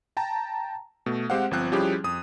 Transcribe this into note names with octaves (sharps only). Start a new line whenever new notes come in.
G5 A5 A#5
B2 A3
G#3 C4 G4 C5 F5 F#5
G1 F3 C4 F#6
F3 G3 C#4 E4 G4 G#4
F2 D#6